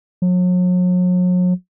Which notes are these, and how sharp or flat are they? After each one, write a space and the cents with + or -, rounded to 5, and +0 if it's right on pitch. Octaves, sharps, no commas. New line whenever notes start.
F#3 -40